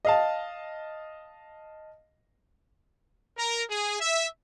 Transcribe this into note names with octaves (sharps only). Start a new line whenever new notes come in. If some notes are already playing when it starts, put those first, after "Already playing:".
D#5 F5 A5
A#4
G#4
E5